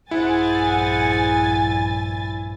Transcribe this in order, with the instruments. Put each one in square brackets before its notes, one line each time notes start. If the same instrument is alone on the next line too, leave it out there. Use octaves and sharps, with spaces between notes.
[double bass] A#1 G2 [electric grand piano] E4 [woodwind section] G#4 C5 F#5 [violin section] G#5 A6